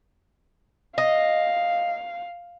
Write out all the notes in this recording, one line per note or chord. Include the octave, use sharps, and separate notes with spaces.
D#5 F5